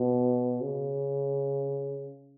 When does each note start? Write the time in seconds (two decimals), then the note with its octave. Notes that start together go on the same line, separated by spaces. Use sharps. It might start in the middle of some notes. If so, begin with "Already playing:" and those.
Already playing: B2
0.61 C#3